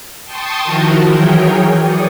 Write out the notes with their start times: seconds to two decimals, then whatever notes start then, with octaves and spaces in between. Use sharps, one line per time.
0.24 G5 A5 C6 C#6 D#6
0.63 D#3 F3 E4 F#4 A#4
1.09 E3 F#3 G#4 A#4 C#5 G5
1.77 D5 C#6 D#6